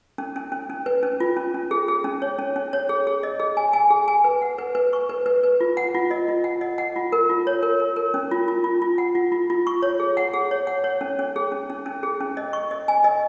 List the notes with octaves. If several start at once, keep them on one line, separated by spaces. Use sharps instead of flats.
C#4
C#4
C#4
C#4
B4
C#4
F4
C#4
C#4
G#4
G#4
C#4
C#5
C#4
C#4
C#5
G#4
G#4
D#5
G#4
G#5
G#5
G#4
G#5
B4
F#5
B4
B4
C#6
B4
B4
B4
F4
F#5
F4
D#5
F4
F#5
D#5
F#5
F4
A#4
F4
C#5
A#4
A#4
A#4
C#4
F4
F4
F4
F4
F#5
F4
F4
F4
C#6
C#5
G#4
F#5
G#4
C#5
F#5
C#5
C#4
C#4
G#4
C#4
C#4
C#4
G#4
C#4
D#5
C#6
D#5
G#5
D#5